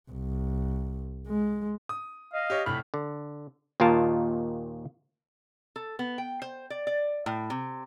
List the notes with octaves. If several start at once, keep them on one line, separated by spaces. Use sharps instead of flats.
C2
G#3
D#6
D#5 F5
G4 C#5
F1 A2 B5 F6
D3
D#2 A#2 D#3 F4 A#4 A5
A4
B3
G5
C5
D5
D5
A2
C3